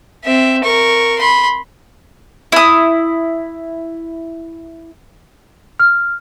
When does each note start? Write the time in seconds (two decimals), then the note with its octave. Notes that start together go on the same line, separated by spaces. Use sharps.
0.24 C4 E5
0.64 A#4 C#6
1.18 B5 C6
2.52 E4 D#6
5.80 F6